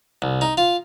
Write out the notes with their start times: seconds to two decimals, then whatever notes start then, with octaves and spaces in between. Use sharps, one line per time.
0.22 C2
0.41 D#4
0.57 F4